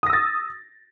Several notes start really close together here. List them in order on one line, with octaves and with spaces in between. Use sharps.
D#6 A#6 E6 A6